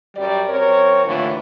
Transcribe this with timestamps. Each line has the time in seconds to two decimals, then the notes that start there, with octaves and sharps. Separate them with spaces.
0.16 F#2 G3 D5
0.48 F#2 C4 A#4 C#5
1.05 D#2 A2 D3 E3 A3 F4